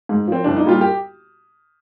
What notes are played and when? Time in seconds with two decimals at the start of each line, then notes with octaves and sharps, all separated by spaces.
0.09 G#2
0.27 F3 C4
0.44 C2 D4
0.56 D#4
0.64 A#2 G3 F4
0.81 G4